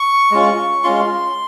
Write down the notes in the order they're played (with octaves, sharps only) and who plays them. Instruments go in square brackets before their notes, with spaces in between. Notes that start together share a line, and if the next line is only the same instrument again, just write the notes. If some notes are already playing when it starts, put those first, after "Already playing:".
Already playing: [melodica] C#6
G#3 C#4 F4
G#3 C#4 F4 C6